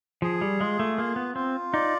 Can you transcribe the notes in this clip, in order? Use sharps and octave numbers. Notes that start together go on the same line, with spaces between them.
F3 G#4
G3
G#3 F4
A3
A#3 F4
B3
C4 F4
D#4 D5